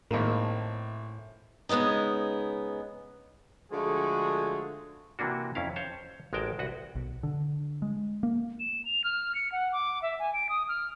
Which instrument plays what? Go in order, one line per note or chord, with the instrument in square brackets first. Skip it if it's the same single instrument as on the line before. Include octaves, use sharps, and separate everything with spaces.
[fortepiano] G#1 A#3 [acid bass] A2
[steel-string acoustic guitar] C#3 G#3 B3 C#4 D#4
[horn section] D3 F3 G#3 A3 F#4 G#4
[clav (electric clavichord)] C3 E3 A#3 D4 F#4
F2 C#4 E4 F5
C5 C#5 A5
A1 G#3 F#4 A#4 G5 A5
C2 F#4 B4 F#5
[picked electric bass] B1
D3
G#3
A#3
[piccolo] E7
F7
F6
C#7
F#5
D6
E5
G#5
D7
D#6
F6